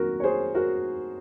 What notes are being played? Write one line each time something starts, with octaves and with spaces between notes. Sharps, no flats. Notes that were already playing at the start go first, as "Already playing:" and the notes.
Already playing: F2 D#3 F#3 A#3 F#4 A#4
C#5
G#4 C5
F#4 A#4